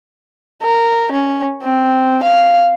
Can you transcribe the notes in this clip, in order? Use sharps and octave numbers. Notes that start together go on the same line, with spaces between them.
A#4
C#4
C4
F5